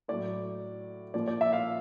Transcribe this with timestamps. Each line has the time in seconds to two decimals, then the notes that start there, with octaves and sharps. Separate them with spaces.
0.08 A2 F#3 D5
1.14 A#2 F3 D5
1.28 D5
1.41 E5
1.53 F5